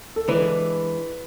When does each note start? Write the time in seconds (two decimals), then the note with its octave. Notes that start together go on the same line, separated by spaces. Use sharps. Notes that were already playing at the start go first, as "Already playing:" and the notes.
0.16 A4
0.28 E3 G#3 D4 B4